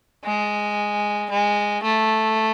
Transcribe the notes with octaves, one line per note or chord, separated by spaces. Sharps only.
G#3
G#3
A3